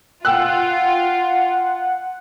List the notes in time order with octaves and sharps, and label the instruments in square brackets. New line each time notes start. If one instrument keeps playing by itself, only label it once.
[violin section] F4 [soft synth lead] F#5 [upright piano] G5 E6 F#6